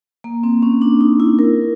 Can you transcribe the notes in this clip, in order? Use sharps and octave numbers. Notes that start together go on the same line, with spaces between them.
A#3
C4
C#4
D4
D#4
E4
A#4